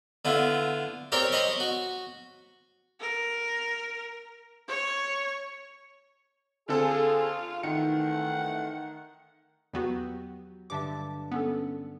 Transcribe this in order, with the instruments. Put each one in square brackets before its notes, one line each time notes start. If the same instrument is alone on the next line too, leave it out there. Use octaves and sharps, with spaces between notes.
[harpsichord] D3 B3 E4 F4
C4 G4 A#4 C#5 D5 G5
C5 C#5 D#5 B5 C6
F#4
[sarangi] A#4
C#5
[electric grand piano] D3 C4 A4 [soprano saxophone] F4 [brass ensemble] G#4
[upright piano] D#3 [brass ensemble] E3 A3 C4 [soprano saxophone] F#5 [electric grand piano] C#7
[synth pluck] E2 B3 F#4 [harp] F#3 G4
[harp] G2 D3 A5 [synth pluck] E5 D6
[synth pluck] B3 C#4 A4